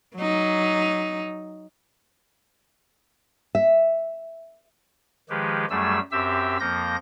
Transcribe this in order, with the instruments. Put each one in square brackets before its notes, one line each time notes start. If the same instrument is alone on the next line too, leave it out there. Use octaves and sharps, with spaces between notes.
[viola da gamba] F#3 D#4
[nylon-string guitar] E5
[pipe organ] D#3 F3 G#3 G4 G#4 B4
F#2 F#3 G3 A3 G#4 E6
F#2 C4 G4 E5 E6
F2 F3 A#3 G6 A#6